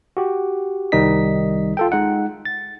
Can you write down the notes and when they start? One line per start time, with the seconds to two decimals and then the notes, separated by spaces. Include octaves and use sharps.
0.17 F#4 G4
0.92 C2 D#3 G3 D#4 D#5 B6
1.77 F4 A4 G5
1.92 G#3 D#4 F#5
2.45 A6